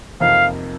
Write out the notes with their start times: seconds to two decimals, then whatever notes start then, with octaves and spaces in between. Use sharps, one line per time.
0.21 F2 C3 F3 A#3 D#4 F5